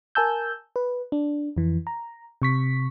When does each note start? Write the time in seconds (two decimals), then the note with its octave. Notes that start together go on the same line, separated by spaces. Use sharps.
0.15 A#4 G#5 A5 E6 G6
0.76 B4
1.12 D4
1.57 F2 E3
1.87 A#5
2.42 C3 C#6 B6